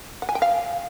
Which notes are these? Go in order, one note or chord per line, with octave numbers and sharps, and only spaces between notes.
F#5
G#5
G5
F5